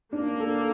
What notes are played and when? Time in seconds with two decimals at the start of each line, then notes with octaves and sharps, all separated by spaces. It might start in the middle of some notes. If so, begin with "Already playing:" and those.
0.13 A#3 D4
0.40 A4